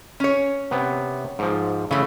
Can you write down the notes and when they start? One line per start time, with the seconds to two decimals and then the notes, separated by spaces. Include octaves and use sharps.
0.20 C#4 C#5
0.71 C3 B3
1.39 G#2 F3
1.91 C#3 E3 A3